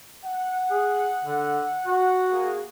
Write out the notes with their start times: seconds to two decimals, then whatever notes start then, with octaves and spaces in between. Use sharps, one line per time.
0.24 F#5
0.71 G#4
1.23 D3
1.86 F#4
2.30 A#3 G#4